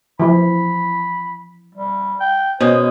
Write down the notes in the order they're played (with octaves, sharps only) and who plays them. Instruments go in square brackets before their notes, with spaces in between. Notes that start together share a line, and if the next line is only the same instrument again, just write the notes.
[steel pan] E3 F3 [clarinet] B5
[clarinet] G3
G5
[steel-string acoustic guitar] B2 G#3 C#4 [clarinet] C5